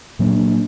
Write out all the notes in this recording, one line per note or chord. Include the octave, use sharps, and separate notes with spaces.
A#2 F#3 A#3 D4